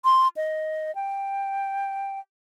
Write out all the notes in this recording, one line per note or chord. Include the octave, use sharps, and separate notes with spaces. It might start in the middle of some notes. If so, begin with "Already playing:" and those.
C6
D#5
G5